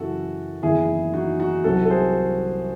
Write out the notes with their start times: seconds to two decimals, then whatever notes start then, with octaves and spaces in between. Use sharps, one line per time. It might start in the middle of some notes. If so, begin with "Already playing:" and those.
Already playing: F#2 C#3 E3 F#4 A4
0.63 F#1 E2 D#3 E4 G#4
1.14 D#4 F#4
1.40 D#4 F#4
1.64 C2 C3 F#3 F#4 A4
1.85 A4
1.90 G#4 C5